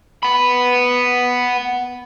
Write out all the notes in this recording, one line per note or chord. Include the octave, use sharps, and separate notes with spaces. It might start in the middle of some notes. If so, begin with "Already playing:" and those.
B3 B5